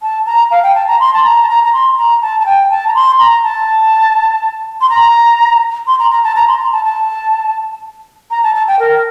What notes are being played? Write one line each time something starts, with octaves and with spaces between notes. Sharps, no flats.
A5
A#5
F5
G5
A5
A#5
C6
A5
A#5
A5
A#5
A#5
C6
A#5
A5
A5
G5
A5
A#5
C6
A#5
A5
C6
A#5
C6
A#5
A#5
A5
A#5
C6
A#5
A5
A5
A#5
A5
A5
G5
A#4